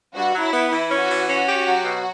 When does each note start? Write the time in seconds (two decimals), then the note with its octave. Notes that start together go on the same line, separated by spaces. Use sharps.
0.15 G2 F#4
0.34 F#3
0.43 E4
0.53 B3
0.71 E3 E4
0.90 C#4
1.00 F#4
1.09 E3
1.29 C#4
1.47 G4
1.66 F#3
1.84 B2